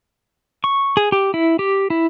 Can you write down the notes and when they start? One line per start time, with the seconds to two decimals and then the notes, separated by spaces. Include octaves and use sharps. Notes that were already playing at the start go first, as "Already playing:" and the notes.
0.64 C#6
0.97 G#4
1.12 G4
1.34 E4
1.59 G4
1.90 E4